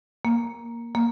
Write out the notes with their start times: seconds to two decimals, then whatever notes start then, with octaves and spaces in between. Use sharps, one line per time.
0.25 A#3
0.95 A#3